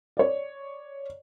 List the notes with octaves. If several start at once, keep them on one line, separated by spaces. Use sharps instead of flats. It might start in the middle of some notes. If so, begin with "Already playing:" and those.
C#5 D5